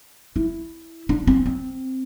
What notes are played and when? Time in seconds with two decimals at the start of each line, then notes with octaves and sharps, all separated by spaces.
0.36 E4
1.09 D4
1.27 C4
1.46 C4